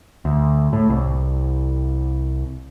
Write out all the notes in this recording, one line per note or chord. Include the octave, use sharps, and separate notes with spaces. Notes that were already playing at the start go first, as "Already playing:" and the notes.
D2
A2
C2